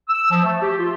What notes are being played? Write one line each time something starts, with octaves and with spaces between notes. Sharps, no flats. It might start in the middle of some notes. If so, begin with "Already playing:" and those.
E6
F3
A3
G4
F4